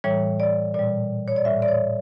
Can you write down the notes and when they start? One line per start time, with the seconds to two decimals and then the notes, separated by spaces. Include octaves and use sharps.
0.04 A2 E3 G3 C#5
0.40 D5
0.74 A#2 G3 D5
1.28 C#5
1.36 D5
1.45 A2 G3 E5
1.62 D5
1.68 C#5